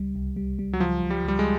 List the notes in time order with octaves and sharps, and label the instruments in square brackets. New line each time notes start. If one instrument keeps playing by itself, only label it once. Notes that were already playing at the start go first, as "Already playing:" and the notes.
Already playing: [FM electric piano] C#2 G3
C2
G3
G3
[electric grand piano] F#3
[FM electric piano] C#2 [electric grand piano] F3
[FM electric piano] C#2
[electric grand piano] G3
[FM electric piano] C#2 [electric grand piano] G3
[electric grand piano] G#3